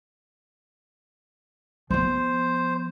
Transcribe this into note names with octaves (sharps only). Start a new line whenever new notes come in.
F3 B3 C5